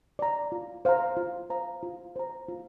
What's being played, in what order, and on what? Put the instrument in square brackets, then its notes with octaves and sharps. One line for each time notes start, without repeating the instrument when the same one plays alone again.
[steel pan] D5 A#5
F4
C5 F5 A#5
F4
C5 F5 A#5
F4
C5 A#5
F4